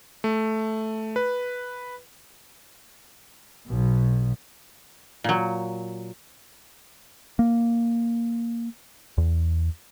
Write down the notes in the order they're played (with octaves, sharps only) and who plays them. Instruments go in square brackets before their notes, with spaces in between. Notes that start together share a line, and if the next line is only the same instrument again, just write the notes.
[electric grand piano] A3
B4
[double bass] B1 B2
[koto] A#2 F#3
[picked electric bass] A#3
E2